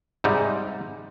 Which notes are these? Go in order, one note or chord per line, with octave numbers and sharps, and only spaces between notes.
G#2 C3 G3 D#4